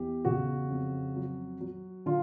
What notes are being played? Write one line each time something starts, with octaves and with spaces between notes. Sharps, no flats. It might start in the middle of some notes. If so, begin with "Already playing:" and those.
Already playing: E2 E3 G4
C#3 F#4
F2
F#3
F#3
D3 F4